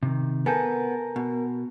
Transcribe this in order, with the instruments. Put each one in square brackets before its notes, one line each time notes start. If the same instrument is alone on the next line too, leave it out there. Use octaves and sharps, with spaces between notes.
[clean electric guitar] C3 D#3
[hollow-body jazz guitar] B3 A4 [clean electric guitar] A#4 [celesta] G#5 A5 G6
[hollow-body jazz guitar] B2